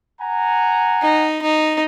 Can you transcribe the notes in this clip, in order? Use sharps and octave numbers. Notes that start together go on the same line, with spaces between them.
F#5 G#5 A#5
D#4
D#4